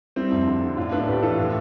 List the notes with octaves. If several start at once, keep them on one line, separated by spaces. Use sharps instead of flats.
G3 C4 E4
F2
D3
D3
A2 D4 F4
A2 B3 D4
A3 G4 B4
E3 F4 A4
A2